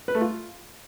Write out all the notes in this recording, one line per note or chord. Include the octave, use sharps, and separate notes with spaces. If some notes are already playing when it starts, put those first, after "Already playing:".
B4
A3
F4